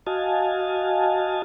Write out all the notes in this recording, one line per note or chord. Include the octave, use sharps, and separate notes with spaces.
F#4 D#5 F5 G#5 A5